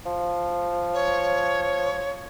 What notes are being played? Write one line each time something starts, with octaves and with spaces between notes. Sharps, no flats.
F3
C#5